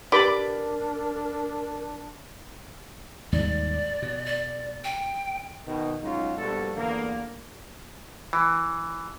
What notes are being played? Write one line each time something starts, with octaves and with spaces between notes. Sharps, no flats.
D4 G4 A#4 B4 D5 B5 D6
D#2 G#2 G3 D5
B2
D5
G5
B2 D#3
F#3 G#3 C#4 D#4 F4 F#4
A#1 G2 B2 D4 F#4 A4
E2 D3 A3 A#3
E3